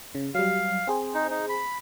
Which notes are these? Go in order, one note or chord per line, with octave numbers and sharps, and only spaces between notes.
C#3
F#3 G3 F5
C4 G#4 C5
D#4
D#4
B5